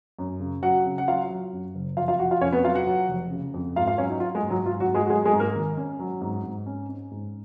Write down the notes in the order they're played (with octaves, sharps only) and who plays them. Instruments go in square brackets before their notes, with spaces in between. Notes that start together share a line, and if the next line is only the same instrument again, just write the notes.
[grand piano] F#2
C#3
F#3 F#4 F#5
C#3
F#5
F#3 F4 F5
F#3
F#2
F#1
F1 F4 F5
F4 F5
F1 F#4 F#5
F4 F5
F2 C#4 C#5
B3 B4
F#3 F4 F5
F#4 F#5
F#3
F1
C#3
F2
G#2 F4 F5
F4 F5
F#3 C#4 C#5
D#4
F#3 F4
G#3 G#4
G#2
F#3 F#4
G#2 F4
F#3 F#4
G#2
G#3 G#4
F#4
F#3 G#3 G#4
G#3 G#4
G#2
A#3 A#4
G#1
C#4
F#3
G#2
G#2
C#4
C#4
G#2